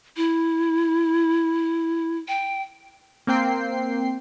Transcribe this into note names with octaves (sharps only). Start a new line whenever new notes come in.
E4
G5
A#3 C4 G5 C7